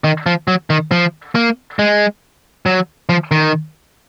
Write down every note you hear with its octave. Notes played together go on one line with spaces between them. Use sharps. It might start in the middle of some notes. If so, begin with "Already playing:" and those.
D#3
F3
F#3
D#3
F3
A#3
G#3
F#3
F3
D#3